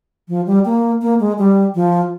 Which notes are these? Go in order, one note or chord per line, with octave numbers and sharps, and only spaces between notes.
F3
G3
A#3
A#3
G#3
G3
F3